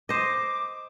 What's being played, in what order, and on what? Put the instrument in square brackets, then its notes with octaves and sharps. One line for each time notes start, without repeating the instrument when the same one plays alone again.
[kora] C5 D#5 [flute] D6